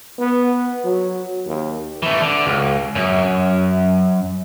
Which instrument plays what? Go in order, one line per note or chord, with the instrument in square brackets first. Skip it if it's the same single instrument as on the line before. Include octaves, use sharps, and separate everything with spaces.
[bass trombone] B3
F#3
D#2
[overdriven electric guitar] E3 A3
D3
C#2
F#2